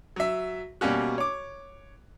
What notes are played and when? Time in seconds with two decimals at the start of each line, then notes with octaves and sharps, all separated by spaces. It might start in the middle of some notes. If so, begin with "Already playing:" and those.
0.16 F#3 E5
0.81 B2 G3 A#3 C#4 F#4
1.18 C#5 D6